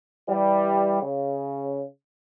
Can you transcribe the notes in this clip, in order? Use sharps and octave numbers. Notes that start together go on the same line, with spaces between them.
E3 G3
C#3